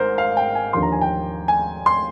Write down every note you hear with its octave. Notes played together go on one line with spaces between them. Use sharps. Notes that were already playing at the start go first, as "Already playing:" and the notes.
Already playing: G#1 G#2 A#4 C5
F5
G5
G#5
D#2 D3 F3 C6
A#5
G#5
G5
G#5
C6